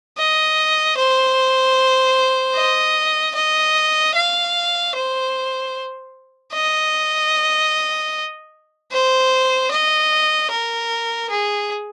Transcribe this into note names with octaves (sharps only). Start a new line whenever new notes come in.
D#5
C5
D#5
D#5
F5
C5
D#5
C5
D#5
A#4
G#4